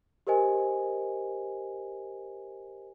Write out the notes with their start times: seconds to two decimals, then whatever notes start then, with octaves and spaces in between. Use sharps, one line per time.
0.27 G4 A#4 C5 D#5 G#5